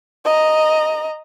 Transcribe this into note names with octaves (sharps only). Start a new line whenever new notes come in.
D#5 A#5